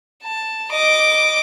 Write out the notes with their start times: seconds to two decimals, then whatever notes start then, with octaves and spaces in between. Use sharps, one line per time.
0.24 A5
0.71 D#5 D6